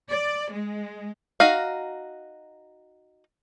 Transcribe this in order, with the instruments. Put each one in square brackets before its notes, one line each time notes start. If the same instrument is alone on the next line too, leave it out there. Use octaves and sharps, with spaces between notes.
[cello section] D5
G#3
[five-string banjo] D#4 F#4 F5